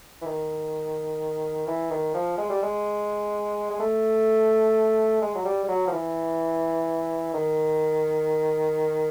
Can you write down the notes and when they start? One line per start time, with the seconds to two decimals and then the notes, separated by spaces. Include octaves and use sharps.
0.21 E3
0.26 D#3
1.67 E3
1.91 D#3
2.15 F3
2.38 G#3
2.50 G3
2.63 G#3
3.70 G#3
3.80 A3
5.22 G#3
5.35 F#3
5.45 G3
5.64 G3
5.69 F#3
5.87 F3
5.92 E3
7.34 D#3